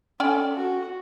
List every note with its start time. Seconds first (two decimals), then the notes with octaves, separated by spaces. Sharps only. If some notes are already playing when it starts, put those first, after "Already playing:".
0.20 C#4 A4 D5 G5
0.56 F#4